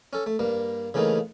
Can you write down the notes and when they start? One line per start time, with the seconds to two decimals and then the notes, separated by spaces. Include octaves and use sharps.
0.13 C#4 A4
0.26 A3
0.39 G2 A#3
0.94 C#3 E3 A3 A#3 D#4